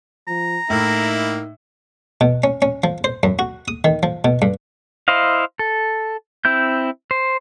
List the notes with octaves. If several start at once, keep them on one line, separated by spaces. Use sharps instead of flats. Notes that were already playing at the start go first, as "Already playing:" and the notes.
F3 A#5
A2 A#3 D#4 E4
B2
C#4
C#4
F3
C5
F#2
F#4
D#6
D#3
F3
B2
G2
E4 C5 D#5 F5
A4
C4 E4 G6
C5